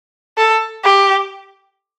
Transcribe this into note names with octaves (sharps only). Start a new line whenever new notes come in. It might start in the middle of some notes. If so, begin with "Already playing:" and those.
A4
G4